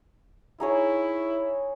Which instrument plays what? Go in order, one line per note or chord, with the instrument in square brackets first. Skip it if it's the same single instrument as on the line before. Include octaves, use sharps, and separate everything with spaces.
[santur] D#4 G#4 C#5 [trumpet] E4